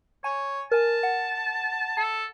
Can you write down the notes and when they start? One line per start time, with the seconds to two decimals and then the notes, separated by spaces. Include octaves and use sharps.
0.24 C#5 G#5
0.71 A#4 G#5 A5
1.03 F#5
1.97 A4 A5